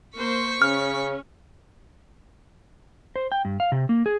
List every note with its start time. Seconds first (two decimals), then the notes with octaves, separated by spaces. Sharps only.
0.17 A#3 C5 C#6 B6
0.62 C#3 C#4 F6
3.16 C5
3.32 G5
3.45 G2
3.60 F5
3.72 C3
3.89 A#3
4.06 G#4